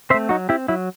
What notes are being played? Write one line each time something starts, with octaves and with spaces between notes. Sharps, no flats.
A3 C4 C5 E5
F#3 D#4 F#4
C4 E4 G4
F#3 E4